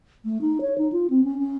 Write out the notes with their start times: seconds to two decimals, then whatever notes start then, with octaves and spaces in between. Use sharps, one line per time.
0.25 A3
0.41 D#4
0.61 C#5
0.78 D#4
0.92 F4
1.10 C4
1.24 C#4
1.39 C#4